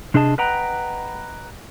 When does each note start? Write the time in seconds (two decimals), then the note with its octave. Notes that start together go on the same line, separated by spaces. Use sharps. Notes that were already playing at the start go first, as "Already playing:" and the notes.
0.14 C3 D4 G#4 D#5 A5
0.38 B4 D#5 F#5 G5 A#5